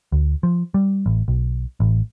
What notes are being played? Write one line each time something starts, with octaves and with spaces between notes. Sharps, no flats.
D2
F3
G3
A1
B1
A1